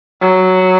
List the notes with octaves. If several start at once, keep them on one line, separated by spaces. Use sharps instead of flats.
F#3